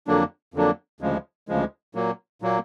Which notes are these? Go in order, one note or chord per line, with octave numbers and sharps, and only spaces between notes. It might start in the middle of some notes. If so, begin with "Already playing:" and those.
F2 D3 F#3 A#3 D4
F2 D3 F#3 A#3 D4
D2 C#3 F3 G#3
D2 C#3 F3 G#3
A#2 F#3 A#3
A#2 F#3 A#3